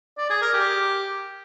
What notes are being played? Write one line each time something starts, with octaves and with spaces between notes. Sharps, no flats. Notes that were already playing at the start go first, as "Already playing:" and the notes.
D5
G#4
A#4
G4